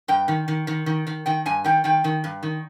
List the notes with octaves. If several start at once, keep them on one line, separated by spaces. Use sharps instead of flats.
G2 G5
D#3
D#3
D#3
D#3
D#3
D#3 G5
G2 G#5
D#3 G5
D#3 G5
D#3
G2
D#3